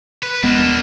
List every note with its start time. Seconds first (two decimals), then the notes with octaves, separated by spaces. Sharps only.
0.23 B4
0.43 D#1 G#3 A#3 B3 D4